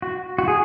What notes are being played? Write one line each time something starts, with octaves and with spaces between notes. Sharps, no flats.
F#4
F#4
G#4